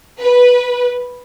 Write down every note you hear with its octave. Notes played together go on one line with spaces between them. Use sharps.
B4